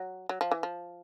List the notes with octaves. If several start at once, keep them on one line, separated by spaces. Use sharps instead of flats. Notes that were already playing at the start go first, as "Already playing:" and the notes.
Already playing: F#3
F#3
F3
E3
F3